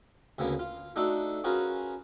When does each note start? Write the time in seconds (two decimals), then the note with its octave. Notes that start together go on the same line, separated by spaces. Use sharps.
0.38 D2 C#3 A#3 B3
0.59 F4
0.96 A3 D4 D#4 F#4 A4
1.44 C#4 F4 F#4 G#4 A#4 B4